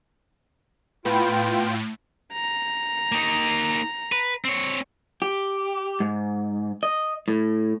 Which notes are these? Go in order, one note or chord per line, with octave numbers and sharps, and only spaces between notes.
A2 B3 F4 G5
A#5
A#3 D#4
B4
C4 C#5
G4
G#2
D#5
A2